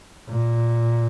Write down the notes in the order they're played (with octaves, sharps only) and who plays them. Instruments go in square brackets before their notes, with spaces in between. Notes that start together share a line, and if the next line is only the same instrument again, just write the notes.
[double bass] A#2